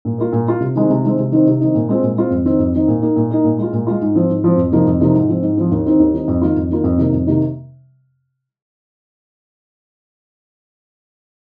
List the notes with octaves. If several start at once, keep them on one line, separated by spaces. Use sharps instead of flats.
A#2
A#3 F4
A#2
A#3 F4
C3
D#3 G#3 C4
C3
D#3 G#3 C4
C3
D#3 C4 D#4
C3
D#3 C4 D#4
A#2
G#3 C4 F4
A#2
G#3 C4 F4
F2
D#3 C4 D#4
F2
D#3 C4 D#4
A#2
A#3 D#4
A#2
A#3 D#4
A#2
G#3 F4
A#2
G#3 F4
G#2
F3 C4
G#2
F3 C4
F2
C3 F3 A#3 D#4
F2
C3 F3 A#3 D#4
G#2
F3 C4
G#2
F3 C4
D#2
D#3 C4 D#4
D#2
D#3 C4 D#4
F2
D#3 A#3 F4
F2
D#3 A#3 F4
F2
C3 D#3 A#3
F2
C3 D#3 A#3